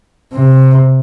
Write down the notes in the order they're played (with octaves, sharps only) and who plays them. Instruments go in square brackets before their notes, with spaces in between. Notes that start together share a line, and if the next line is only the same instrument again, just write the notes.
[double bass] C3